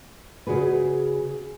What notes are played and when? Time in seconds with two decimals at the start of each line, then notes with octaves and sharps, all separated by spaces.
0.47 C#3 F#4 G#4 B4